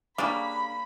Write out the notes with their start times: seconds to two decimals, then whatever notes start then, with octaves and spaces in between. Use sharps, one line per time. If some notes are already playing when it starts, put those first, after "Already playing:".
0.18 C#3 G3 A#3 D4 B5